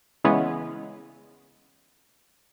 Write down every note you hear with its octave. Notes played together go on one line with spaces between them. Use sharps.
C#3 E3 G#3 B3 C#4